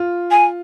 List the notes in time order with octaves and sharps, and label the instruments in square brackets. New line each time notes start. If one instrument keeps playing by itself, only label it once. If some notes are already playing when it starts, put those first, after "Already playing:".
Already playing: [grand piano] F4
[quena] G#5